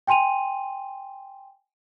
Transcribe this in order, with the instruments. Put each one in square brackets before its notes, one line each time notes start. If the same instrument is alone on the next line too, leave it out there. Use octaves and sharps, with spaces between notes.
[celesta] G5 G#5 C6 D#7 F7